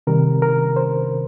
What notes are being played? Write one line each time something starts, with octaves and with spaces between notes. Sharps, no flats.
C3 D#3 G3 A#4
A#4
C5